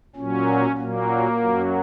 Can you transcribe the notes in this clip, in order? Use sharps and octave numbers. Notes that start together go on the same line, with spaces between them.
A#2 F#3 C#4
A#2 F#3 A#3
F#2 F#3